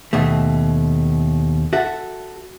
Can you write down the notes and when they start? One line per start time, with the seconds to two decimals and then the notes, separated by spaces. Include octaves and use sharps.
0.13 D#2 B2 A3
1.73 F#4 A4 E5